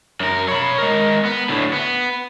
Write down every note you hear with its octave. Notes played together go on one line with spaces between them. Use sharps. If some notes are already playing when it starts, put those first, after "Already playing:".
F#2 A#4
C#5 B5
G#3 A#4
B3
D2 A2
B3